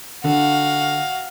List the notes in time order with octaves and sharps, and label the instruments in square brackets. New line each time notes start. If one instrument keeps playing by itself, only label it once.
[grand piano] D3 [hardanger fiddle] F#4 F5